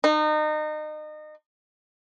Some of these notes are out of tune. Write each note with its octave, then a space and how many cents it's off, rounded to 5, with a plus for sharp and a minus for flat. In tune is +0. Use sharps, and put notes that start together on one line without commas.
D#4 -30